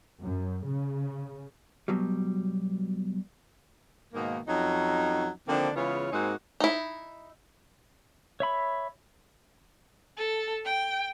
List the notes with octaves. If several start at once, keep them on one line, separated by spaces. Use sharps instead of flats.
F#2
C#3
B2 F#3 G3
G#2 B2 D#3 A#3
F2 F#3 C#4 D#4
D3 D#3 F3 A#3 C4 D4
C#3 E3 G#3 B3 F4 C#5
G#2 G#3 A#3 C4 D#4 F#4
D#4 E4
C#5 E5 B5
A4
G5